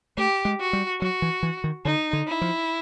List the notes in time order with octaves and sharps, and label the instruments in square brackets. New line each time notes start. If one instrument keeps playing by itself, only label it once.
[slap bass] A3 [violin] G4
[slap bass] G#3
[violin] F#4
[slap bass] G3
[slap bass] F#3 [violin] F#4
[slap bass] E3
E3
D#3
[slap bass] D3 [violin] D#4
[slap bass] D3
[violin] E4
[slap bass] F3